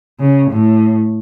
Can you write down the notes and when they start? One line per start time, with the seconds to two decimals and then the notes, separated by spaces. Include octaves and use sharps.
0.20 C#3
0.51 A2